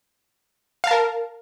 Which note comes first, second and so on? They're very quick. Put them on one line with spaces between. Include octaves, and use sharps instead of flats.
F5 A5 A#4